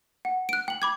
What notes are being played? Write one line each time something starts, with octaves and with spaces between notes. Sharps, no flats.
F#5
F#6 D7
G5 F#7
B5 D6 G#6